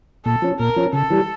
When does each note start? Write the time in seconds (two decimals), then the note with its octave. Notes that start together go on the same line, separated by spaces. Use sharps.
0.25 A#2 A4
0.42 F3 C#4
0.59 A#2 A#4
0.76 F3 C#4
0.93 C#3 A4
1.10 E3 G3